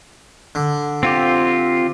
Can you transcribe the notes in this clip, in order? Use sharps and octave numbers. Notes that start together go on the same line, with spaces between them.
D3
C4 F4 G4